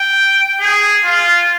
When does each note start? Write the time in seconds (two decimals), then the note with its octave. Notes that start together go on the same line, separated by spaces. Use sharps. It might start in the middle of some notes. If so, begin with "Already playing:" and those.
Already playing: G5
0.60 G#4
1.05 F4